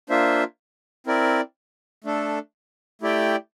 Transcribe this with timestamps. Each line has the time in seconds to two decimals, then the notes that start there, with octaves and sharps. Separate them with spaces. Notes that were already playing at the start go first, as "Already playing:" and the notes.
0.09 A#3 D4 F4 C5 E5
1.07 C4 E4 A#4 D5
2.04 A3 D4 A4
3.01 A3 E4 G4 D5 G5